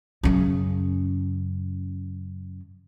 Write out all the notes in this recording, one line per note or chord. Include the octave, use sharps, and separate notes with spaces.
F#2 C#3